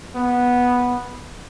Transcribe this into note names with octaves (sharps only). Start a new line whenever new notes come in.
B3